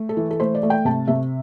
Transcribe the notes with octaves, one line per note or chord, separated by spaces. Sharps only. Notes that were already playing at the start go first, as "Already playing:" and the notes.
Already playing: A3
A4
E3
A4
A3 C5
D5
A3
G5
C3 A5
C3 E5